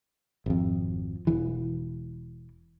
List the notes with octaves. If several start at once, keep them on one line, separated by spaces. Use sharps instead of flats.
G#1 F2
E1 E2 E3